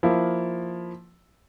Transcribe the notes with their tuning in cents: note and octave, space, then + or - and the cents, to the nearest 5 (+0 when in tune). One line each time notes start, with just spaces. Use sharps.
F3 +0 A#3 +0 E4 +0